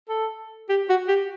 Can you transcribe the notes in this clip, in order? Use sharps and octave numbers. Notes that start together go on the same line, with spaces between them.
A4
G4
F#4
G4